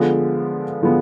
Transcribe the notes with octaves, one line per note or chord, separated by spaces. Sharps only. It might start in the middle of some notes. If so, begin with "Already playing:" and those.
Already playing: D3 F3 G#3 B3
D3 F3 G#3 B3